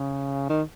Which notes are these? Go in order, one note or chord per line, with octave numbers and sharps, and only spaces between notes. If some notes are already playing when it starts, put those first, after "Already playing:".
Already playing: C#3
D#3